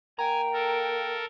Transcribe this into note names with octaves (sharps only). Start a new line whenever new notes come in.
A#3 G5 G#5 A#5
A4 A#4